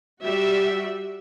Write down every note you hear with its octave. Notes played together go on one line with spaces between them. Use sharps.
G3 F#4 E5